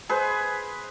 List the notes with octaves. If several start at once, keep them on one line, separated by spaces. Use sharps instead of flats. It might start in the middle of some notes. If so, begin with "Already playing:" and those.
G#4 B4 C5